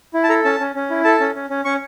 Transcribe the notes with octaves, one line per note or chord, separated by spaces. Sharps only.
E4
A5
A4 A#5
C#4 A5
C#4
C#4
E4
A4 A5
C#4
C#4
C#4
C#4 C#6